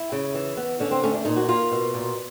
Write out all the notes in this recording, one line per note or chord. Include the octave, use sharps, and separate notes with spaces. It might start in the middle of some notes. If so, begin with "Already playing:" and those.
Already playing: E4
C#3
E3
B3
D3 C#4
C4
A3 C#4
D4
A#2 D#4
F#4
A#3 F4
B2
A#2